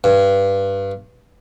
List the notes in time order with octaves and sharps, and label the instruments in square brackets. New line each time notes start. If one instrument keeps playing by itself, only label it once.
[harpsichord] G2